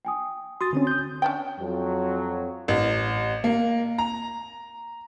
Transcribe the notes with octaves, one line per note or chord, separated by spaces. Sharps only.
G5 G#5 D#6
F#4 C6 D#6 A6
D3 C4 C#4
D#6 G6
C#4 D4 G5
F2 F#3
A1
A#3
A#5